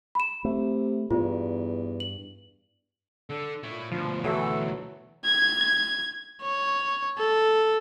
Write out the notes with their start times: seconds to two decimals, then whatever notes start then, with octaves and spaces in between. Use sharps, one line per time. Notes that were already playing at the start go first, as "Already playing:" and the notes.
0.15 B5 E7
0.45 C3 A3
1.11 E2 G2 F4
2.00 F#7
3.29 D3 A4
3.63 A#2 E4 C#5
3.92 D2 B2 F3
4.24 E3 F#3 A3 F#4 A4
5.26 G#6
6.42 C#5
7.18 A4